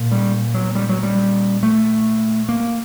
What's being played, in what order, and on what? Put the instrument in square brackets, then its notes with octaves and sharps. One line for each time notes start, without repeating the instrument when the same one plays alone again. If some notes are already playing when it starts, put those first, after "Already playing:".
Already playing: [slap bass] A#2
G3
F#3
G3
F#3
G3
A3
A#3